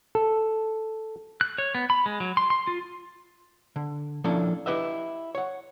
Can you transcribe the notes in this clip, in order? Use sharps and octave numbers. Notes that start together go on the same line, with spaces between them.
A4
F#6
C#5
B3
B5
G#3
F#3
C6
C6
F4
D3
F3 A#3 C#4 D4 E4 A4
E4 G4 B4 D#5 E5
C#5 F#5